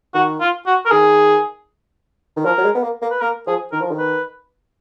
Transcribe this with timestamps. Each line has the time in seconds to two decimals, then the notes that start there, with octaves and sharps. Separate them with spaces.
0.14 D#3 F#4
0.41 F4
0.66 F#4
0.86 A#4
0.91 D#3 G#4
2.37 D#3
2.45 F3 A#4
2.58 F#3
2.64 G#3
2.75 B3
2.83 A#3
3.02 A#3
3.11 B4
3.21 A#3 A#4
3.47 F3 G#4
3.72 D#3 A#4
3.82 F3
3.91 D#3
3.99 B4